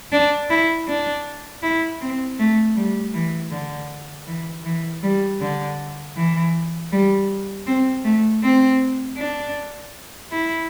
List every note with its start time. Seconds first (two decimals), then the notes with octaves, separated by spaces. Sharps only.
0.12 D4
0.50 E4
0.88 D4
1.63 E4
2.01 C4
2.39 A3
2.76 G3
3.14 E3
3.51 D3
4.27 E3
4.65 E3
5.02 G3
5.40 D3
6.16 E3
6.92 G3
7.66 C4
8.04 A3
8.43 C4
9.17 D4
10.31 E4